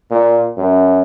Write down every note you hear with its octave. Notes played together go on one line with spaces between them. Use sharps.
A#2
F#2